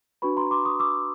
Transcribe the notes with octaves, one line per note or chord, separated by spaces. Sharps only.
D4 F#4 B4 B5 C#6
A#5 C6
C6 D6
C#6 D#6
D6 E6